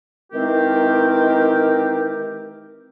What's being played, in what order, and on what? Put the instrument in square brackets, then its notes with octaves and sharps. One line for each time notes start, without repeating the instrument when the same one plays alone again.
[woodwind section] D#3 E3 G#3 C4 G4 A#4